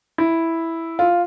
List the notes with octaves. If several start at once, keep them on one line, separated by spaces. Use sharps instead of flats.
E4
F4